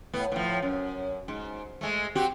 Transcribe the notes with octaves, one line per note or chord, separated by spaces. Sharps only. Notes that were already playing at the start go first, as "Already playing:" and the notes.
A2 B3
A2 F3
F#2
G#2
G#3 A3
C4 F#4 G4